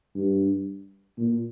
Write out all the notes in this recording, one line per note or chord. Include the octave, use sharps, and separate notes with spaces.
G2
A#2